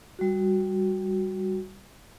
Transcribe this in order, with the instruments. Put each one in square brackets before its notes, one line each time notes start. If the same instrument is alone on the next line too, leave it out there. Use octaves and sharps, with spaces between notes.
[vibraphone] G3 F#4